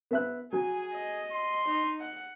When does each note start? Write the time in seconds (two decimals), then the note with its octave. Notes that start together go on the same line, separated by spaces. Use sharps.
0.11 B3 E5 F#6
0.53 F#3 G#4 G#5
0.94 D#5
1.32 C6
1.69 D#4
2.00 F#5